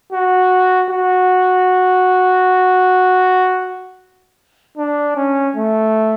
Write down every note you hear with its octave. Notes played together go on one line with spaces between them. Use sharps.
F#4
F#4
D4
C#4
A3